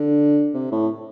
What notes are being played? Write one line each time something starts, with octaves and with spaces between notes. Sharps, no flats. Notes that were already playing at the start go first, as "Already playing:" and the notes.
Already playing: D3
C3
A2